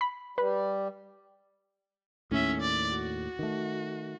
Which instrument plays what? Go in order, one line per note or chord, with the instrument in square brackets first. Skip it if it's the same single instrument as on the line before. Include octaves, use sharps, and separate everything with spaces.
[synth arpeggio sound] B5
[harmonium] G3 [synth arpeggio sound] B4
[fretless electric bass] D#2 A2 [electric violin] C#4 E5
[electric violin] D5
F#4
[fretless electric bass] D#3 A3